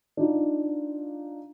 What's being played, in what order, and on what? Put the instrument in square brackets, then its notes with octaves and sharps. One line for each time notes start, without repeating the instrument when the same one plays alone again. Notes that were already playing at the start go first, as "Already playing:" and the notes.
[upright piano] D4 D#4 F4